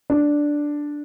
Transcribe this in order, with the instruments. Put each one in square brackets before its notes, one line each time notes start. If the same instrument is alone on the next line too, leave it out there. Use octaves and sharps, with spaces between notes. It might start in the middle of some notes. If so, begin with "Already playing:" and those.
[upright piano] D4